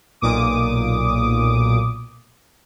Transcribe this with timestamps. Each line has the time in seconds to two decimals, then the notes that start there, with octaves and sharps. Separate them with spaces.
0.21 B1 A#2 D6 D#6